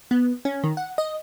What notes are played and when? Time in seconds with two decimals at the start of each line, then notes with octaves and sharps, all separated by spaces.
0.11 B3
0.45 C#4
0.64 D#3
0.77 F#5
0.98 D#5